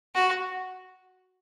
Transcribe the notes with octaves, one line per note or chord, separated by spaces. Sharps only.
F#4